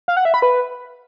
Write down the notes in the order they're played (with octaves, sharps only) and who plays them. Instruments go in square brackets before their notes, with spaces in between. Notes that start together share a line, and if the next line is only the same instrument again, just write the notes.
[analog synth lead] F5
F#5
E5
B5
B4